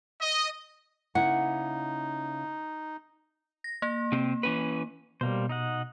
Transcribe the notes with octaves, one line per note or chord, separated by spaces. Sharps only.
D#5
C#3 A#3 D#4 E4 F#5
A#6
A#3
C3 C4
E3 C#4 B4
B2 G3 A#3 C5
D#4 D#5 F#5